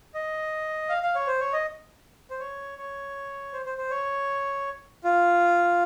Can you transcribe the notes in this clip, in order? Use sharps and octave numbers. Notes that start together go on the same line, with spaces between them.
D#5
F5
F5
C#5
C5
C#5
D#5
C5
C#5
C#5
C5
C5
C5
C#5
F4